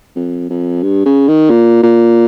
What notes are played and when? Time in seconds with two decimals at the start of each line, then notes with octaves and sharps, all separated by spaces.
0.16 F2
0.50 F2
0.83 G2
1.05 C#3
1.28 D#3
1.50 A#2
1.83 A#2